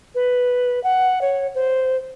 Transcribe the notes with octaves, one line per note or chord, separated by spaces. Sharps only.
B4
F#5
C#5
C5